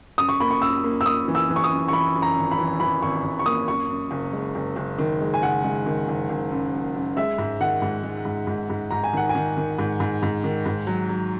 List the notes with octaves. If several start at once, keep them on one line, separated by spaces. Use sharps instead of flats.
F#2 D#6
C#6
A#3 B5
C#6
F#2 E6
A#3
E6
A#3 D#6
E3
E6
E3
C#6
D#6
F#2
C#6
E3 B5
F#2
A#5
G#1
B5
E3
E3 B5
G#1 C#6
G#1
C#6
A#3 D#6
F#2 C#6
F#2
F#1
G#3
F#1
F#1
D#3
G#3
G#5
F#1 F#5
G#3
D#3
F#1
F#1
F#2
F#2
F#2
G#3 E5
G#2
D#3 F#5
G#2
G#3
G#2
G#2
G#2
G#2 A#5
G#5
D#3 F#5
G#5
D#3
D#3
G#2
G#2
G#2
D#3
G#2
F#3
F#3